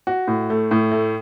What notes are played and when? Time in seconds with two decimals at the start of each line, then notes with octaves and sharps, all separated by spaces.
0.07 F#4
0.28 A2
0.50 A3
0.71 A2
0.92 A3